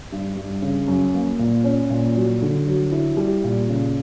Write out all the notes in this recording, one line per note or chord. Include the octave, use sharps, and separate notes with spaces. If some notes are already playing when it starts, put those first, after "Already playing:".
G2
G2
C#3
F#2
A#3
A#2
C#4
A#2
F#3
D3
F#3
E4
G3
A#2
C#3